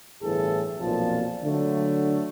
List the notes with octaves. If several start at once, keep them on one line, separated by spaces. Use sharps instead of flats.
G1 A2 E3 G#4 A4
B1 F2 A#2 F3 A5
D3 F#3 A3